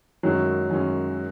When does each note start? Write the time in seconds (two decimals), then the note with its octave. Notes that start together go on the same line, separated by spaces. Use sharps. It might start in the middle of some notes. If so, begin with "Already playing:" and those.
0.23 F#2 D#3 F#3 G#3 C#4
0.70 F#2 D#3 G#3 C#4